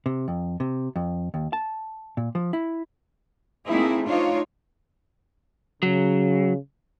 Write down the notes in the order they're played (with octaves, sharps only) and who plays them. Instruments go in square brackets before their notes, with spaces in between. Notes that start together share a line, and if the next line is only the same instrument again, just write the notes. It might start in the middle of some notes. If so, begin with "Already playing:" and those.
[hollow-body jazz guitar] C3
F2
C3
F2
D#2
A5
A#2
F3
E4
[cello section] A3 A#3 C4 D#4 E4 G#4
D4 D#4 F4 C5 C#5
[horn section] C#3 [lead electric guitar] F#3